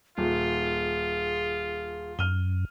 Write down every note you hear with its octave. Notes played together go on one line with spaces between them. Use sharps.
D#1 F4 G#4
F#2 F6 D#7 G7